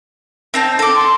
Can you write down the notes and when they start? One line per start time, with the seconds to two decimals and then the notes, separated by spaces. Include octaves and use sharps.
0.54 C4 D#4 A5
0.79 A4 D6
0.96 C6